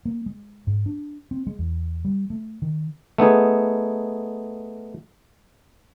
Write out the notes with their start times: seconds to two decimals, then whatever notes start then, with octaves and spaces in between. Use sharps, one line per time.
0.05 A#3
0.26 G#3
0.67 G#2
0.86 D4
1.31 C4
1.47 G#3
1.59 E2
2.05 G3
2.30 A3
2.62 D#3
3.18 A3 B3 D#4 G#4